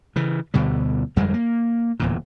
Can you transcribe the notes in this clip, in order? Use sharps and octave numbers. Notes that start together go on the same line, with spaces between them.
C#3 E3
D2 B2 D3 G3
G1 F2 G3 G#3
A#3
D1 E2 A#2